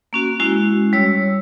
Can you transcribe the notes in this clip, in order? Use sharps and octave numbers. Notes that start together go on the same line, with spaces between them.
A#3 C#4 F#4
G#3 C#4 E4 F#4 G#5
G3 C#5 E6